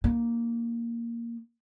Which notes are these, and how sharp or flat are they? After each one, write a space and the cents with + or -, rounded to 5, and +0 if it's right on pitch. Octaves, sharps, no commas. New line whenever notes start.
A#3 +0 D#4 -25